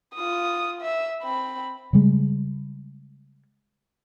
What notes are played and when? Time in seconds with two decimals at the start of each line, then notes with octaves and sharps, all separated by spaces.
0.15 F4 D#6
0.82 E5
1.23 C4 B5
1.93 C#3 G3 G#3